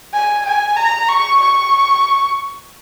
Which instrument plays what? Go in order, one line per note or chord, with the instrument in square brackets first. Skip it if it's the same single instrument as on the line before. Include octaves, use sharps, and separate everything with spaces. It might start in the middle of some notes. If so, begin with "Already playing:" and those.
[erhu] G#5
G#5
A#5
C#6
C#6